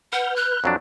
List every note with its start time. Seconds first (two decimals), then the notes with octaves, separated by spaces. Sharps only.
0.13 B4 F#5 F6 G6
0.36 F#6
0.64 F2 F#3 D4